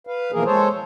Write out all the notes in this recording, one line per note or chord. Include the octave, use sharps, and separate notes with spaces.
B4 F5
B2 E3 F3 A#3 G#4 A#4
G#3 A4 C5 C#5